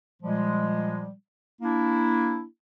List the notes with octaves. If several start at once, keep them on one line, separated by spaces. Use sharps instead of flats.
A#2 F3 G3 G#3
A#3 D4 E4